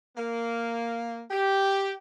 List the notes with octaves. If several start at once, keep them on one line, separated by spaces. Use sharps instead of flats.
A#3
G4